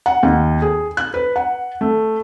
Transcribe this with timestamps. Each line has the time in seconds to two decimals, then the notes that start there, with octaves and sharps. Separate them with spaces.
0.06 F#5
0.23 D#2
0.62 G#4
0.97 F#6
1.14 B4
1.36 F#5
1.81 A3